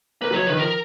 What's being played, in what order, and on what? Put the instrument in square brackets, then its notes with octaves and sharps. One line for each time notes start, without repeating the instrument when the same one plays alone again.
[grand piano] A#3 [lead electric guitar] B4
[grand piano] F#3
[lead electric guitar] C#5
[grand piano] F3
[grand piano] D#3 [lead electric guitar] B4
[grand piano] F3 [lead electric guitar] A#4